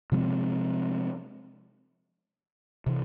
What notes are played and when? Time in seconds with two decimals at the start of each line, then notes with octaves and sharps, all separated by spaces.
0.12 C3 F3 G#3 C4
2.86 C3 E3